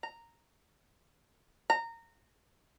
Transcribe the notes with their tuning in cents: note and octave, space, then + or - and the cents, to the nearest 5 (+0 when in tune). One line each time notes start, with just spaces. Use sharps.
A#5 -5
A#5 -20